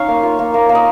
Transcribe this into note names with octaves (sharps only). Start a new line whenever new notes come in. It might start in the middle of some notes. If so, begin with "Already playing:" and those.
Already playing: C#4 D#4 C#5 F5
A#3
F4
A#3
A#3
A#3
D#5